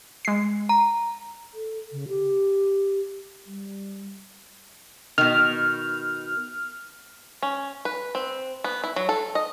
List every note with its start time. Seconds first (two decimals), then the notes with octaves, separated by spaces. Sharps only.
0.25 G#3 C7
0.69 A#5
1.54 A4
1.92 C#3
2.08 G4
3.46 G3
5.18 B2 D#3 F6
7.42 C#4
7.85 B4
8.15 C4
8.64 B3
8.84 E4
8.96 F#3
9.09 A4
9.35 D#5